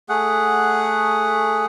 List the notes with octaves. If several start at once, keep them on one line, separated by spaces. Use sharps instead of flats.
A3 G#4 F#5